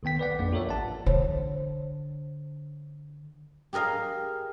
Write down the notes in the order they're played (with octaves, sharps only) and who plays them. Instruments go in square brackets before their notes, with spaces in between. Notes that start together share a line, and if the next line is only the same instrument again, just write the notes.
[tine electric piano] B1 D#3 B3 G5 B6
B4 D5 F#5
A#1 F2 A#3 D4 D5
F4 A4 A#4 C#5 D5 E5
A1 F#5 A5
[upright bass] D3 [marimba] C5 C#5
[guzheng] G4 G#4 A#4 D#5 F5